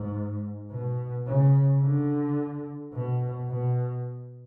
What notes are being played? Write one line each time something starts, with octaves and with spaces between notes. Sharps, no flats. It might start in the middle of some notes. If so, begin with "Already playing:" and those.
Already playing: G#2
B2
C#3
D3
B2
B2